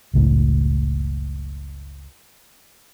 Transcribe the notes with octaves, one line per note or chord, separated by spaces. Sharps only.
F#1 C#2 A2